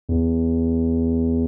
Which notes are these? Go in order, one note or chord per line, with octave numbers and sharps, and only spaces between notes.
E2